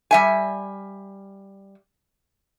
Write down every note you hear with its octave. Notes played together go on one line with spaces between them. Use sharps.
G3 E5 G#5